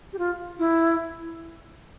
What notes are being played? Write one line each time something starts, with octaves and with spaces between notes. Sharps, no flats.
G4
F4
E4